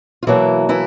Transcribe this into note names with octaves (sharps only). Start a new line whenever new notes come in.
F4
B2 E3 F#3 A#3 E4
E3 E4